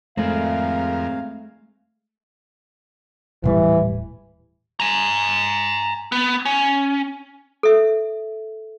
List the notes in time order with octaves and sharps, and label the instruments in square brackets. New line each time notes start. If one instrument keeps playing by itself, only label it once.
[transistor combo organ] F2 A#4 [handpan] G#3 A3 [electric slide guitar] C4 G#4 [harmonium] F5
[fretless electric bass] D#1 A2 G3 [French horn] E3
[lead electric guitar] G#5 A#5
B3
C#4
[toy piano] A4 E5